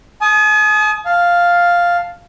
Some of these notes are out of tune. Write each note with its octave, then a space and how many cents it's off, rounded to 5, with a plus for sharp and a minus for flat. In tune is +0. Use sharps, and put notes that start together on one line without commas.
G#5 +45 D#6 +0
F5 +0 A5 +0